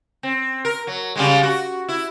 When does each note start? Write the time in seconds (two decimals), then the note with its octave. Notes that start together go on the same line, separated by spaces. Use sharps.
0.23 C4
0.65 A#4
0.87 F#3
1.16 C#3 G3 G#3
1.43 F#4
1.88 E4